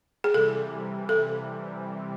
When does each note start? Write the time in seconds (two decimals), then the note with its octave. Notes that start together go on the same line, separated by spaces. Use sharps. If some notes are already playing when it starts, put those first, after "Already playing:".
0.24 G#4
0.34 C3 E3 G3 A4
1.09 A4